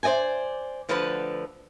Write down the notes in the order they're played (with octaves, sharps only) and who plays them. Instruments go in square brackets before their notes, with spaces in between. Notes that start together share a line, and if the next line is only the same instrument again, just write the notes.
[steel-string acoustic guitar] C5 D5 D#5 G5 G#5
D2 D3 F3 B4 A5